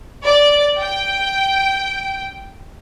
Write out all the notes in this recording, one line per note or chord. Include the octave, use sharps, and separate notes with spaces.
D5
G5